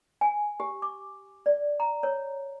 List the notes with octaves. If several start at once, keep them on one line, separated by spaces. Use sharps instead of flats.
G#5
G4
D6
D5
A#5
C#5